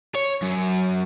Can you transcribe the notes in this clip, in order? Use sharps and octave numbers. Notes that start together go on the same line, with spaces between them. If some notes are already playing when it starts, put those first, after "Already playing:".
C#5
F#2